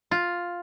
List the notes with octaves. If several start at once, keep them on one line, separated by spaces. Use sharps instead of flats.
F4